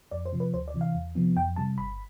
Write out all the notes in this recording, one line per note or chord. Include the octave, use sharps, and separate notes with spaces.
F2 D5
C5
C3 F3
B4
D2 C5
D5
C3 E3
F5
E2
C3 F3 B3
F2 G5
C3 G3 A5
G1 B5